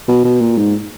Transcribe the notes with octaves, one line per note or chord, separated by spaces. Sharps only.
B2
B2
A#2
G#2